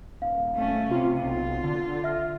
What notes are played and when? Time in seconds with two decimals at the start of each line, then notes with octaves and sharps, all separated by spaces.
0.22 D#1 F5
0.55 A3 C#4
0.91 C3 F4
1.22 B1 F4
1.63 D3
2.04 E5 F6